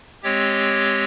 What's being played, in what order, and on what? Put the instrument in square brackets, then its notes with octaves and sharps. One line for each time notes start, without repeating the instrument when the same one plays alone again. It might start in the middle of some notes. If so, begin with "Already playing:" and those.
[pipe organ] G#3 C4 G4 C#5